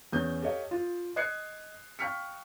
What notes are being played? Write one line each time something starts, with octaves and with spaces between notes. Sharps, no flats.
E2 C#4 D#6 G6
G4 A4 C#5 D#5 F5
F4
D#5 D#6 F#6 G#6 C7 C#7
F5 G5 C#6 F6 B6 C#7